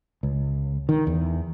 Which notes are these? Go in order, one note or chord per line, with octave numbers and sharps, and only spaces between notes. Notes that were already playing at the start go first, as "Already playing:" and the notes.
C#2
D#3
E2